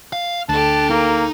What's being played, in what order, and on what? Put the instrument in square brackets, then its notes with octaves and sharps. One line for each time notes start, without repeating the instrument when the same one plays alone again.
[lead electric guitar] F5
[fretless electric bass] D2 [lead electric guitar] D4 [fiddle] G4 A4 [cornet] A5
[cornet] A#3 [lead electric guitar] D#4